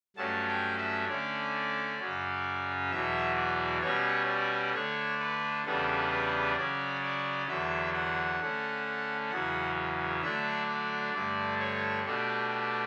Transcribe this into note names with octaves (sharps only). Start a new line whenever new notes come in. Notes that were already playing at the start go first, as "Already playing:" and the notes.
G2 F#3 A3 C#4 A5
G5
E5
D3 A3 C#4 D5
F#2 C#3 F#3 C#4
E2 B2 F#3 E5
D5
B2 G3 C#4 C#5
D5
D3 A3 D4 C#5
B4
E2 C#3 G3 B3 D4 A4
B4
C#3 F#3 C#4 D5
D5
E2 D3 F#3 E5
F#5
D3 A3 C#4
E2 C#3 F#3 F#5
D3 F#3 A3 D4 E5
D5
G2 D3 A3 D5
C#5
B2 A3 D4 G4
G4